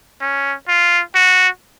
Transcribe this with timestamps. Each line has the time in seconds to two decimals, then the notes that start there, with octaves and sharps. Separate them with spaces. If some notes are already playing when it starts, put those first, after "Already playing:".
0.21 C#4
0.68 F4
1.15 F#4